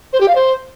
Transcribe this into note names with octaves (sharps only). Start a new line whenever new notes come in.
C5
G4
F5
C5